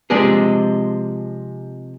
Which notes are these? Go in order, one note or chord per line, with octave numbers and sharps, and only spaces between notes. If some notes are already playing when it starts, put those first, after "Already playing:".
C3 F3 G#3 D4 G#4